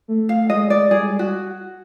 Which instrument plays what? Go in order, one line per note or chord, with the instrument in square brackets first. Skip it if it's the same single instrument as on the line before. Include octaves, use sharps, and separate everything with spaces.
[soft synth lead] A3
[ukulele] F5
[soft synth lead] G#3 [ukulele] D#5
[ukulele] D5
[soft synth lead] G3 [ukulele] G#4
[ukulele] F#4